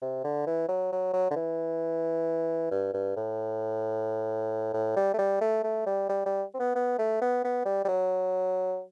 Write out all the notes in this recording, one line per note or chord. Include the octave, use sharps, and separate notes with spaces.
C3
D3
E3
F#3
F#3
F#3
D3
E3
G2
G2
A2
A2
G3
A3
G3
A3
A3
G3
G3
G3
C4
B3
B3
A3
B3
B3
G3
G3
F#3